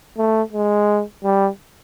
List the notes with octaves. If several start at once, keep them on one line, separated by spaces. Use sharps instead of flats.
A3
G#3
G3